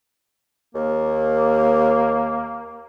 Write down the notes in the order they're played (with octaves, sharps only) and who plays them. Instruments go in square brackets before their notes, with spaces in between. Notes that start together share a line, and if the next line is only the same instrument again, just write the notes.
[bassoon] D#2 [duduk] A#3